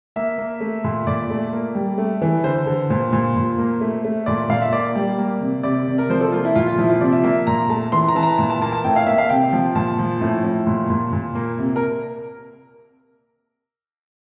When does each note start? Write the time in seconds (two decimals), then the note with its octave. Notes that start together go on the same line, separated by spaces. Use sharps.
0.16 A#3 E5
0.38 A#3
0.61 A3
0.84 A#2
1.07 A#2 D5
1.30 A3
1.53 A#3
1.75 G3
1.98 A3
2.22 E3
2.44 D3 C5
2.67 D3
2.90 A#2 C5
3.12 A#2
3.36 A#2
3.58 A#3
3.81 A3
4.05 A3
4.26 A#2 D5
4.49 A#2 F5
4.61 E5
4.73 A#3 D5
4.96 G3
5.18 A#3
5.41 C3
5.63 C3 D5
5.88 C3
5.98 A#4
6.10 F3 C5
6.21 A4
6.32 A#3 F4
6.45 E4
6.55 A#2 F4
6.68 F4
6.78 F3 E4
6.89 F4
7.01 C3 D5
7.12 E5
7.24 A#3 E5
7.47 A#2 A#5
7.69 A3 A5
7.92 E3 C6
8.09 A#5
8.15 E3 A5
8.23 A#5
8.38 A#2 A5
8.50 A5
8.62 A#3 A5
8.72 A5
8.84 A2 G5
8.96 F5
9.07 A#3 E5
9.18 F5
9.30 C3 G5
9.53 F3
9.75 A#2 A5
9.99 F3
10.21 A2
10.44 A2
10.67 A#2
10.90 A#2
11.13 A#2
11.35 A#3
11.58 C3
11.76 A#4